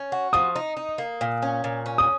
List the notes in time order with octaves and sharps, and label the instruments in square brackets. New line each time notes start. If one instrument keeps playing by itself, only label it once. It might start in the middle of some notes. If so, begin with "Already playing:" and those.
Already playing: [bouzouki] C#4
F#4
[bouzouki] F3 [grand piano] D#6
[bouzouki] D#4
D#4
A#3
A#2
C#4
A#2
C#4
[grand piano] D#6